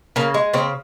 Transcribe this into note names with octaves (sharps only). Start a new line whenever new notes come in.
C#3 A#3
G#3
C#3 C4